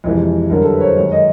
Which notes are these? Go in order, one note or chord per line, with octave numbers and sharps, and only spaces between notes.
F2 C3 E3 G#3
F#2 D3 G3 A#4
A4
B4
C#5
C5
F#2 D#3 G#3 C#5
D#5